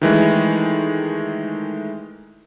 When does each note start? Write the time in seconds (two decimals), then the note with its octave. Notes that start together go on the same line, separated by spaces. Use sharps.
0.02 D#3 E3 G#3 A3